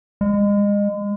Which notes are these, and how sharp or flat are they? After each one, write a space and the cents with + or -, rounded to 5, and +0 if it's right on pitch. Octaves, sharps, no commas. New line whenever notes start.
G#3 -30